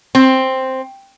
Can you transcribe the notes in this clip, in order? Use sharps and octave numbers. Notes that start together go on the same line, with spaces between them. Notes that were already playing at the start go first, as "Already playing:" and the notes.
C4